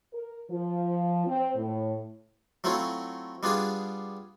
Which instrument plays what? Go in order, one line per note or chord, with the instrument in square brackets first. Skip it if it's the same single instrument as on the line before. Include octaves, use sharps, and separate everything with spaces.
[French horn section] A#4
F3
C4
A2
[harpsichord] F#3 A3 C4 E4 F4
G3 B3 D4 F4 G#4